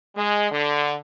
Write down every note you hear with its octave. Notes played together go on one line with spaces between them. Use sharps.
G#3
D3